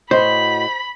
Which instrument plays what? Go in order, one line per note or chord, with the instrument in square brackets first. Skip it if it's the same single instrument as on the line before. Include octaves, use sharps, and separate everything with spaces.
[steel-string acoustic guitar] A2 F#4 D#5 [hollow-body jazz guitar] C5 [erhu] B5